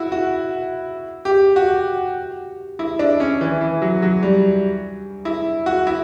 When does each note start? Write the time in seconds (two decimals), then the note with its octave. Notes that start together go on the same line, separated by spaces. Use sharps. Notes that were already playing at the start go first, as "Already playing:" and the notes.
Already playing: E4 F#4
0.12 F#4
1.25 G4
1.56 F#4
2.79 E4
2.99 D4
3.20 C#4
3.41 E3
3.61 E3
3.82 F#3
4.02 F#3
4.23 G3
5.25 E4
5.66 F#4
5.87 E4